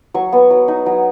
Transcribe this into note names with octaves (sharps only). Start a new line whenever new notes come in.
F#3 C#6
B3
F#3
D#4
F#3